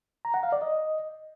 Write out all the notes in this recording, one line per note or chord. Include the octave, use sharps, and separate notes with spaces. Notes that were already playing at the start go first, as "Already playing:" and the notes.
A#5
F#5
F5
D5
D#5